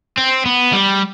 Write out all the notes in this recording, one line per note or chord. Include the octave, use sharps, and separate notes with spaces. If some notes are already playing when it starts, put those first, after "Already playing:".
C4
B3
G3